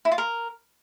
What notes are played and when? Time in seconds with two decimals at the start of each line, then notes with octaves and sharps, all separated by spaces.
0.05 E4
0.12 F4
0.18 A#4